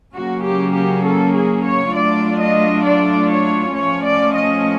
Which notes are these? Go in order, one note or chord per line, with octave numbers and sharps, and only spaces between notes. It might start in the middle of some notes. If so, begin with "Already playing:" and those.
C#3 F#3 A#3 C#4 F#4
G4
G4
A4
G#4
C#5
F#3 A3 D4 F4 D5
D#5
D5
C#5
F3 A3 C#4 C#5
D5
D#5